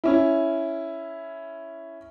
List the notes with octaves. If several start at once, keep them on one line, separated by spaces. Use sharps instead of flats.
C#4 E4